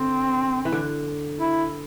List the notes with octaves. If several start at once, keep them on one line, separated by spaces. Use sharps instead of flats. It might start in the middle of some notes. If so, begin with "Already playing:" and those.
Already playing: D3 C4
E3
D3
E4